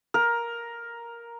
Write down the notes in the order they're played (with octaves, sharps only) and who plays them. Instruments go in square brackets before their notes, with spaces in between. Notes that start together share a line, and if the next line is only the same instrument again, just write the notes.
[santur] A#4